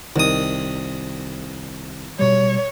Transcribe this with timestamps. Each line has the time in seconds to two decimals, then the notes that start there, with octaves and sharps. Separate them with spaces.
0.16 C2 D#3 D#6
2.19 B2 G3 C#5